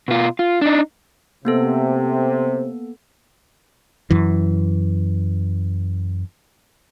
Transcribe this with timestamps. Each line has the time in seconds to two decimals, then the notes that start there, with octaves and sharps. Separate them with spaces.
0.08 B2 F4
0.39 F4
0.61 D4 D#4
1.45 C3 A#3 B3 A4
4.10 F#2 E3